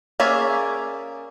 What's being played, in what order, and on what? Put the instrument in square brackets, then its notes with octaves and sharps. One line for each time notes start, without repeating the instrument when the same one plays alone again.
[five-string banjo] A#3 C#4 G#4 D5 E5